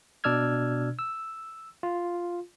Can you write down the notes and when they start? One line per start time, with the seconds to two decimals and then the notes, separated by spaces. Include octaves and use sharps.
0.24 B2 D4 D5 E6 F6 G#6
0.99 E6
1.83 F4